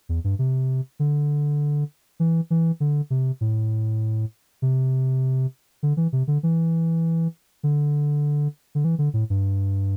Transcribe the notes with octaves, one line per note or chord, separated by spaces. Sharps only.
E2
G2
C3
D3
E3
E3
D3
C3
A2
C3
D3
E3
C3
D3
E3
D3
D3
E3
D3
A2
G2